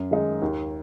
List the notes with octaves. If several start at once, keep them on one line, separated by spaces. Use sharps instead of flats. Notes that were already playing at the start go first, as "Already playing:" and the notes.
Already playing: F#2
D#3 G#3 D#4
D#2